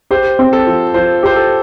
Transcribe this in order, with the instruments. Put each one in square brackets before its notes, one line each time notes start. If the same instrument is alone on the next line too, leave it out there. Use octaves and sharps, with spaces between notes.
[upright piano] G4 [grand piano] C5
[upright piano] C4
[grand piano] A4
[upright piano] F3
[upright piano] F3 [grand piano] C5
[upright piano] G4 [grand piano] C5
[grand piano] A4